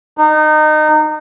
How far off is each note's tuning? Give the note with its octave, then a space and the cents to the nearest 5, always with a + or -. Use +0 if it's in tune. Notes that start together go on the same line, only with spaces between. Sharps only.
D#4 -25